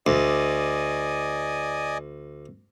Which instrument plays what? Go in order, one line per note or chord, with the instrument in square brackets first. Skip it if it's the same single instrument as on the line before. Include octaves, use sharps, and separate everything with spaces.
[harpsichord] D2 [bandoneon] D5 D#5 G#5